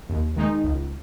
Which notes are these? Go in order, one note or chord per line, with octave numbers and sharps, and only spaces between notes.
D#2
D#3 G#3 D#4
C#2